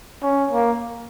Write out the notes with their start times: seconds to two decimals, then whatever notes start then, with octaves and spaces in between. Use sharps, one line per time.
0.23 C#4
0.51 A#3